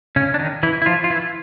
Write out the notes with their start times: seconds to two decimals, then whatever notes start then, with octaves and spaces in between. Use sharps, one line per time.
0.16 C#3 C#4
0.34 D4
0.39 D#3 D#4
0.63 E3 E4
0.82 E4
0.86 F3 F4
1.04 F4
1.10 E3 E4